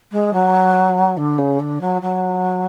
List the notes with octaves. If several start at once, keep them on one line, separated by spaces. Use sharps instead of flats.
G#3
F#3
D3
C#3
D3
F#3
F#3